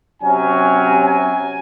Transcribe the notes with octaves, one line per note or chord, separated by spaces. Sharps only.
C3 F#3 C#4 G#5
G#5